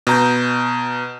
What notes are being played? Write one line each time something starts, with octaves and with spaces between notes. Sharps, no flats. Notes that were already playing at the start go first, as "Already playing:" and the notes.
B2 A#5 G6